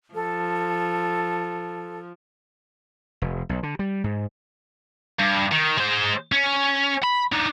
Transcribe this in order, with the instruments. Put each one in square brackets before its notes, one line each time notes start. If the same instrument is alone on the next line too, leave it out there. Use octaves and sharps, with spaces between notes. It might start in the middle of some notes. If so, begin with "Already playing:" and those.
[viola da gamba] F3 [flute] A4
[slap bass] F1
B1
D3
G3
G#2
[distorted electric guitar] G2
D#3
G#3 C5
C#4
B5
D4 D#4